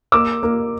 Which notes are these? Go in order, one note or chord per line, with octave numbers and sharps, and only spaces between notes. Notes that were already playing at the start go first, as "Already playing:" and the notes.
A#3 D6 E6
A#3